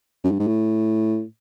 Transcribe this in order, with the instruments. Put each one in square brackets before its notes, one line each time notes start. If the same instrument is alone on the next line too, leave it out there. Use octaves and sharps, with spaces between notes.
[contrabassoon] F#2
G2
G#2
A2